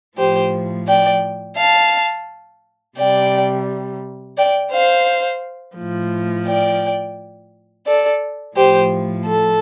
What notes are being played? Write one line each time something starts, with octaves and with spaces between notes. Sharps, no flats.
A2 F3 G4 C5
D5 G5
F5 A5
C3 G3 D5 G5
D5 G5
C5 F5
A2 F3
D5 G5
A4 D5
A2 F3 G4 C5
A4